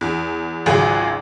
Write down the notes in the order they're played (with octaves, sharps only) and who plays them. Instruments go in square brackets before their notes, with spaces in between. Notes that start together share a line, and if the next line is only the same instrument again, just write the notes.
[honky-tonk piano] E2
G#1 C#2 F#3 G#4 G#5